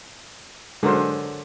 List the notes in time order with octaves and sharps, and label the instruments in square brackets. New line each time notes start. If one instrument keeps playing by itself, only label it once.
[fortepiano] D3 F#3 [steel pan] G#3 A#4 C5